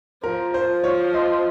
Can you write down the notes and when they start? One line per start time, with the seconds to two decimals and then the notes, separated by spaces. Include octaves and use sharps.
0.23 F3 A#4
0.54 C5
0.68 F3
0.84 C#5
1.14 D#5